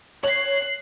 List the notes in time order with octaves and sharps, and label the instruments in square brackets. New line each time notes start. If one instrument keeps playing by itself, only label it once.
[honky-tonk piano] C#5 [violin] F#6 C7